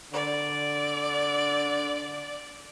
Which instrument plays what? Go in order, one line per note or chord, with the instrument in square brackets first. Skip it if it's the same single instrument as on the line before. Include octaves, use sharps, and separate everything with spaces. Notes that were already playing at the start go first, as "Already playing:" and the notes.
[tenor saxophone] D3 [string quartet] D5